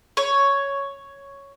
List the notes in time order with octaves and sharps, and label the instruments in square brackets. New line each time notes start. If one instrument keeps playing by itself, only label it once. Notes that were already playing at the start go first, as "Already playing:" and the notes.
[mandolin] C#5